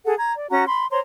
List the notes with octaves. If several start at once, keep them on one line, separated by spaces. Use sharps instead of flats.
G#4 A4 F#5
A#5 G#6
D5
C#4 F#4 A#5
B5 C6
C5 C#5 A#5 C6